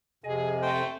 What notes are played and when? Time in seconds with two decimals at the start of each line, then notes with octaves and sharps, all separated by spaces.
0.24 F2 C3 G#4 D#5 G#5
0.62 A3 C5 G5